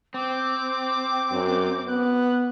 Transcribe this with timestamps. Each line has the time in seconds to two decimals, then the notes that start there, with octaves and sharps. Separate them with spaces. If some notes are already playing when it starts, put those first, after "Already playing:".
0.14 C4 D6
1.31 F#2
1.87 B3 F#6